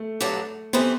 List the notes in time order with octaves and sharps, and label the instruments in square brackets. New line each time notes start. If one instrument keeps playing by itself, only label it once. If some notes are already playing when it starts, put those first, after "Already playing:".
Already playing: [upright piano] A3
[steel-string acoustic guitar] G2 F#3 B3 D4
[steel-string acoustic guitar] E3 A3 C4 G4 [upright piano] B3